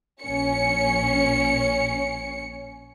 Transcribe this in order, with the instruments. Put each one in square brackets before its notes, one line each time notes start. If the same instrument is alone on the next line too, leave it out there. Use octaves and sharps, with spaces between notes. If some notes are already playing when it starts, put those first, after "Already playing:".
[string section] A#1 C#4 C#7